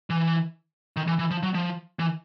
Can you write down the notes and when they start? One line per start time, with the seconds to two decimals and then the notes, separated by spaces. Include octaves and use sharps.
0.10 E3
0.97 D#3
1.08 E3
1.19 E3
1.31 F3
1.43 F#3
1.55 F3
1.99 E3